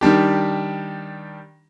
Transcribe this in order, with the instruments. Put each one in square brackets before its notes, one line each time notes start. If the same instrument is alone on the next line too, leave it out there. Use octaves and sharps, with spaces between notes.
[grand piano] D#3 G3 D4 G4